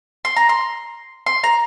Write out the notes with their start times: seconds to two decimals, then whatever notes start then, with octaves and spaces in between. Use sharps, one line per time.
0.25 C6
0.36 A#5
0.49 C6
1.27 C6
1.44 A#5